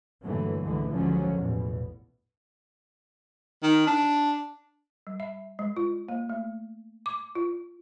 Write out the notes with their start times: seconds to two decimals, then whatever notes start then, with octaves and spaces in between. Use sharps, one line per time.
0.21 G2 A#2 D3 E3 F#3 A3
0.62 C#2 D3 E3 G#3 A3
0.91 C#2 G#2 D3 F3 F#3 C#4
1.32 A1 E2 B2
3.63 D#3
3.87 D4
5.07 G3
5.20 E5
5.59 G#3
5.77 F4
6.09 A#3
6.30 A3
7.06 D6
7.35 F4